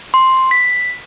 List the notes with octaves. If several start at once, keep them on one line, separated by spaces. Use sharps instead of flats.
C6
B6